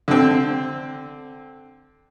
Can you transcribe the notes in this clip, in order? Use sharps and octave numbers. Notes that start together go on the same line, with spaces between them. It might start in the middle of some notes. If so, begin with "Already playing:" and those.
D3 C4